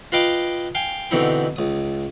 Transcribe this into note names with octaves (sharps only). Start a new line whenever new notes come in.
F4 B4 D#5 F5 G5 D6
F5 G5 G#5
B2 D3 E3 C4 D#4 E4
C#2 D#6